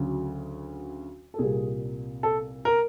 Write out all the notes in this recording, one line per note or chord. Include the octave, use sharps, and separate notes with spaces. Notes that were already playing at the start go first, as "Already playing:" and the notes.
Already playing: D2 C#3 F#3
A4
C2 A#2 G3 G#4
A4
A#4